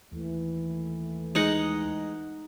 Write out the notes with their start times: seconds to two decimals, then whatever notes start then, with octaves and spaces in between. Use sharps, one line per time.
0.12 D#2 E3 A3
1.35 G#3 D#4 D#5 F#5